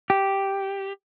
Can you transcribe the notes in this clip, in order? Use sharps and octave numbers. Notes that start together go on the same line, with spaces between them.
G4